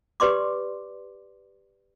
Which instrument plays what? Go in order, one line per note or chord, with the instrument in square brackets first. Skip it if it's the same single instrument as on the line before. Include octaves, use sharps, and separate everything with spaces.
[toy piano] G4 B4 D5 C6 D6